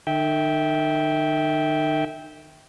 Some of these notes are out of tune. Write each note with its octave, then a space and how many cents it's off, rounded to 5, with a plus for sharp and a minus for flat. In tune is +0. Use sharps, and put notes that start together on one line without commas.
D#3 -40 E5 -20 G5 +0